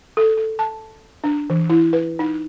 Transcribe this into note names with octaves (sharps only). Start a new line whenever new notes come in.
A4
A4
A5
D4
E3
E4
B4
D#4